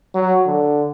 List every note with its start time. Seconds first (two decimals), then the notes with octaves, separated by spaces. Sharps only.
0.14 F#3
0.46 D3